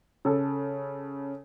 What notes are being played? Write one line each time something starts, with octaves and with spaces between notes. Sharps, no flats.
C#3 A4